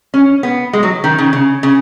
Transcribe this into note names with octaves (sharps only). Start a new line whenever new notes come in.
C#4
B3
G#3
F#3
D#3
C#3
C#3
C#3